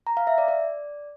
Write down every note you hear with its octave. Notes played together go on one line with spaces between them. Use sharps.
A#5
F5
E5
D5
D5